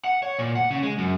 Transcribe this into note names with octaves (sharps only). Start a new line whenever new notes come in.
F#5
C#5
A#2
F#5
C#3
G#3
F#2